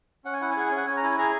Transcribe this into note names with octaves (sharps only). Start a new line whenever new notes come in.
C#4 F#5
G#5
E4 F#5
G#5
G#4 F#5
G#5
C#4
F#5
C#4 G#5
A#5
E4 G#5
G#4 A#5